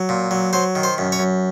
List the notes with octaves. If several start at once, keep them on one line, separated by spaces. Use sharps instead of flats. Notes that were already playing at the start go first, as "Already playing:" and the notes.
Already playing: F#3
A#2
F#3
F#3 C5
D#3
C5
F#2
C#5
F#2